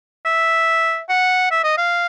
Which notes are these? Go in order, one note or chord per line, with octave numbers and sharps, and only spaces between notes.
E5
F#5
E5
D#5
F5